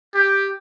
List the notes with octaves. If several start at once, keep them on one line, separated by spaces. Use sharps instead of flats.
G4